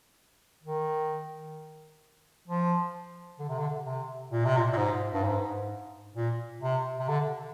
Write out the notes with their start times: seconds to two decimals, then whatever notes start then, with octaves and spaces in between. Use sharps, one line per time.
0.63 D#3
2.48 F3
3.39 D3
3.49 C3
3.59 D3
3.85 C3
4.31 A#2
4.45 C3
4.57 A#2
4.73 A#2
4.77 G#2
5.13 G2
5.24 G#2
6.16 A#2
6.62 C3
6.99 C3
7.09 D3